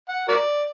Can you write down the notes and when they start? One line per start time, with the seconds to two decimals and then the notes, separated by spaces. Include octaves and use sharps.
0.08 F#5
0.28 F#4 A#4 D5